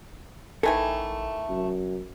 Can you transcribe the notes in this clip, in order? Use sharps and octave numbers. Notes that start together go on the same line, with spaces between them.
A1 D#3 E3 A3 A4 G#5
F1 F#2